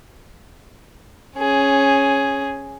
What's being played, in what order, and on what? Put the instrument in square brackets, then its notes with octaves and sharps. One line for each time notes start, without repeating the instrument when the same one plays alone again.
[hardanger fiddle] C#4 G#4